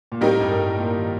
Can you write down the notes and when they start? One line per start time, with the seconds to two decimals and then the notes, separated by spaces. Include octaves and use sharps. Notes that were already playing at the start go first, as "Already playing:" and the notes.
0.12 A#2
0.21 A2 G3 C4 D#4 G4 A#4
0.40 G2
0.51 G2
0.59 A2
0.78 A#2
0.97 D#3